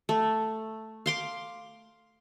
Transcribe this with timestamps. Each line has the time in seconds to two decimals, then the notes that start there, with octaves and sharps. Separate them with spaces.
0.09 A3
1.06 F5 C6 D6